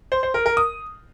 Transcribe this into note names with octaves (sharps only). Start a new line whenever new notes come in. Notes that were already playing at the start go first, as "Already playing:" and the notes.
C5
C5
A#4
A#4
D#6